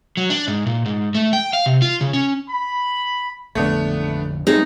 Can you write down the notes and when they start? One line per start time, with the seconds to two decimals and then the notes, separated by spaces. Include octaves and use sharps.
0.17 F#3
0.30 D4
0.48 G#2
0.67 A#2
0.86 G#2
1.15 A3
1.33 G5
1.53 F5
1.66 C3
1.82 F4
2.01 C#3
2.13 C#4
2.49 B5
3.55 A1 F2 D3 A3 B3 D4
4.47 F#3 G#3 B3 C4 D#4 G#4 A4